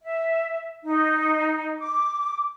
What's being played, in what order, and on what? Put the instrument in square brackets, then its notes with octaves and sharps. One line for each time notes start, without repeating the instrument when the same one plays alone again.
[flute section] E5
D#4
D6